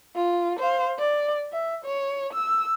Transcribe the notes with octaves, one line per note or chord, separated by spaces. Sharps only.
F4
C5 F5
D5
E5
C#5
E6